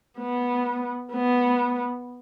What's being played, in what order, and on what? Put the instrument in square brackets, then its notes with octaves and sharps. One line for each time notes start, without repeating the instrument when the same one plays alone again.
[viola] B3
B3